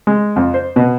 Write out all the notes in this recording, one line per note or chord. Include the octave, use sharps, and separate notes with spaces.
G#3
F2
C5
B2